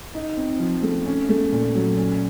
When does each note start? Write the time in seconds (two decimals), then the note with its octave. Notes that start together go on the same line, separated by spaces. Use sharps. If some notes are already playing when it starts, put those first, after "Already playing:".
0.15 D#4
0.37 C4
0.60 F3
0.82 A3
1.06 C#4
1.29 A3
1.52 A#2
1.75 F#3
1.97 C#4